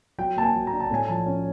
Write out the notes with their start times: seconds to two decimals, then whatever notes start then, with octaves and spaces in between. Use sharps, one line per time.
0.18 F#3 G5
0.36 A#3 A5
0.43 G#5
0.55 F#3
0.67 A#5
0.73 D4
0.80 A5
0.90 A2 G#5
1.08 F3 A5
1.26 C#4